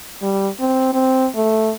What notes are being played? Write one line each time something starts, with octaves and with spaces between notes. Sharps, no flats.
G3
C4
C4
A3